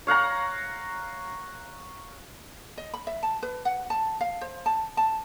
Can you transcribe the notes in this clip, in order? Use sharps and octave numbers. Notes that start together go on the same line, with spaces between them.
C#5 F5 F#5 A#5
D#5
B5
E5
A5
B4
F#5
A5
F5
C5
A5
A5